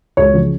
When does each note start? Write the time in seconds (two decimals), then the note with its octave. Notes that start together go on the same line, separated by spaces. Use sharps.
0.17 C#2 C#5
0.34 C#3 F3